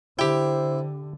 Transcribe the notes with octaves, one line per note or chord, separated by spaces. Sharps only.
D3 E4 G4 C5 G5